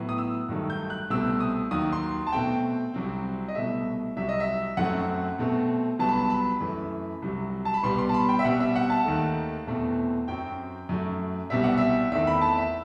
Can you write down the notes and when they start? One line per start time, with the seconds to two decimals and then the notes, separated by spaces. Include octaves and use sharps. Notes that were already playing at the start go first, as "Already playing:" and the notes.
Already playing: A2 F#3 B3
0.09 D#6
0.18 E6
0.49 G2 D#3 F#3 A3
0.70 G6
0.90 F#6
1.10 C2 B2 A3 C4 E6
1.40 D#6
1.71 D#2 D#3 F#3 D#6
1.93 C6
2.27 A5
2.32 B2 A3 C4 G5
2.94 C2 C3 F#3 C4
3.48 D#5
3.55 C2 B2 A3 E5
4.16 C2 C3 F#3 E5
4.29 D#5
4.40 E5
4.77 F#2 F#3 A3 C4 F#5
5.39 B2 A3 C4
5.99 C2 C3 F#3 B3 A5
6.09 B5
6.17 A5
6.30 B5
6.60 F#2 E3 A3
7.22 C2 C3 F#3
7.65 A5
7.74 B5
7.83 C2 B2 G3 B3 C6
7.98 C6
8.09 A5
8.14 B5
8.29 G5
8.39 E5
8.44 B2 G3 C4 F#5
8.60 E5
8.76 F#5
8.90 A5
9.05 D#2 D#3 A3
9.67 E2 B2 A3 C4
10.28 F#2 F#3 C4 G5
10.89 F#2 F#3 A3
11.50 C2 B2 G3 C4 E5
11.64 F#5
11.78 E5
12.12 E2 D#3 A3 C4 E5
12.27 B5
12.42 A5
12.58 E5